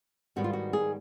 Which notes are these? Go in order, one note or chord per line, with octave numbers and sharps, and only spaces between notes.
G#2 D#3 G3 B3 F#4
F4
F#4
G#4